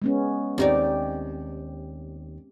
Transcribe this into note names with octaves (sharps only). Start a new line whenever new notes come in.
G#3 B3 C#4
D#2 C4 D#4 G4 D5